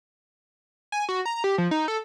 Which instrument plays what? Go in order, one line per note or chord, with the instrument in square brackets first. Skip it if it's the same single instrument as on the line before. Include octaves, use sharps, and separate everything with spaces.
[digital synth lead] G#5
F#4
A#5
G4
F3
D#4
A4